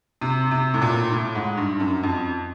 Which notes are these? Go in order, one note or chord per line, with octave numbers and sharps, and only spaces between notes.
C3
C3
A2
A#2
A2
G#2
G2
F#2
F2